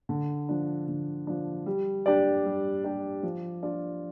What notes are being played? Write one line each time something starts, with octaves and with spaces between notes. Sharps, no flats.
D3
F3 D4
D3
F3 D4
G3
D4 G4 D5
G3
D4 G4 D5
F3
D4 F4 D5